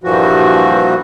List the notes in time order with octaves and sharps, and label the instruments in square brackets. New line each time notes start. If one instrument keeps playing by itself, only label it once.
[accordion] G2 A#2 E3 F3 F#4